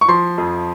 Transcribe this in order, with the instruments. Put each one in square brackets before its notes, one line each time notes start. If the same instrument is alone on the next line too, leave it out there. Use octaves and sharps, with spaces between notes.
[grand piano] C#6
F3 C6
F2